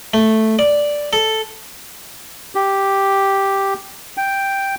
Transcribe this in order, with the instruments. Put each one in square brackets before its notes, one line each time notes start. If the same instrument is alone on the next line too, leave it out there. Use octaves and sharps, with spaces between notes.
[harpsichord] A3
D5
A4
[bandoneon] G4
G5